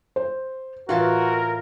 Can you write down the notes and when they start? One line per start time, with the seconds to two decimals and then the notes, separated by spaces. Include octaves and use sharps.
0.16 C5
0.89 A2 E3 F4 F#4 A#4 F5 A5